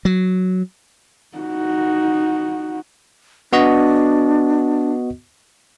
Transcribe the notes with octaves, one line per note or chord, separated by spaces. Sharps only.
F#3
D#4 F#4
B3 D4 F#4 D#5